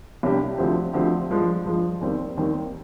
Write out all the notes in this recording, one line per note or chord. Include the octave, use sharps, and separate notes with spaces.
C2 C3 G3 D4 G4
D2 D3 F3 C4 G4
D2 D3 F3 C4 G4
G2 F3 G#3
G2 F3 G#3
D#2 D#3 G3 C4
D#2 D#3 G3 C4